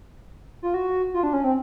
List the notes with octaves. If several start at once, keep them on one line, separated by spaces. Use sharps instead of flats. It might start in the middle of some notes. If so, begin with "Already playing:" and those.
F4
F#4
F4
D4
C#4
C4